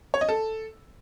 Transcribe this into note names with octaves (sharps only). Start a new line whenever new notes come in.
C#5
D#5
A4